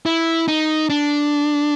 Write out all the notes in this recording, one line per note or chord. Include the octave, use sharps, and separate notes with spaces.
E4
D#4
D4